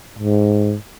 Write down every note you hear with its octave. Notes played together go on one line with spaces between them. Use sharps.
G#2